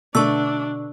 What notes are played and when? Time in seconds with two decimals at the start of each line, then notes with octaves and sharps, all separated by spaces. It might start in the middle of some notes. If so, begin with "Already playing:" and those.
0.15 B2 D3 A3 D4 C#6 E6